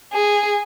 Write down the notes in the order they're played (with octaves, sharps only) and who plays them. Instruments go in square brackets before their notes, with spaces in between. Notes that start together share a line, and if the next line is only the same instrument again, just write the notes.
[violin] G#4